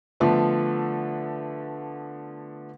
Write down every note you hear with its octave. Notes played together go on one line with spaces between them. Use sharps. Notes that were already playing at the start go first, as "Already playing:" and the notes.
D3 F3 A3 B3